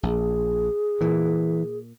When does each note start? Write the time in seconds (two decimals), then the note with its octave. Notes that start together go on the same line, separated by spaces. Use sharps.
0.03 A#1 G#4
1.01 A#2 E3